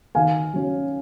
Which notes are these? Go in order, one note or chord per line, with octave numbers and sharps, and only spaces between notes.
D#3 F5 G#5
F#3 C#4